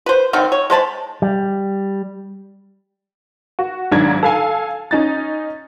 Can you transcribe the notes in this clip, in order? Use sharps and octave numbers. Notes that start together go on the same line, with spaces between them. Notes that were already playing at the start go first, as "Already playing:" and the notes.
B4 C5
D3 D#3 F#3 C4
C#5
G#3 C5 A5 B5
G3
F#4
B1 G#2 D#3 D4 G#6
A4 F5 G#5
C#4 D#4 A6